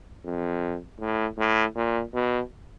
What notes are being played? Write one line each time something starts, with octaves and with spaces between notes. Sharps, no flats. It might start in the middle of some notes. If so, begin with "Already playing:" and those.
F2
A2
A2
A#2
B2